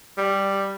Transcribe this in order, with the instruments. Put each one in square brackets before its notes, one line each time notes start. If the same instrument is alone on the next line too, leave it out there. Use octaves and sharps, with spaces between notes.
[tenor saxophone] G3